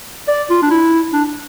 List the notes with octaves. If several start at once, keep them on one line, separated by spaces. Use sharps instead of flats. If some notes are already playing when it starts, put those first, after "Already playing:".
D5
F4
D4
E4
D4